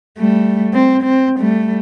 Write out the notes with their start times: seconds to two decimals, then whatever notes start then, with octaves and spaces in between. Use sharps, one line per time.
0.18 G3 A3
0.74 C4
1.03 C4
1.38 G3 A3